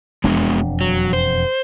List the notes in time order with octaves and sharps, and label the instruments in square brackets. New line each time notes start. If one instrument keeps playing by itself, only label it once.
[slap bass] E1 F2 D4 [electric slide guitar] G#3 B3 F#4
[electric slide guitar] F#3
C5